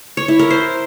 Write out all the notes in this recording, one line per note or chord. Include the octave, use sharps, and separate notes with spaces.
C#5
E4
A#4
C5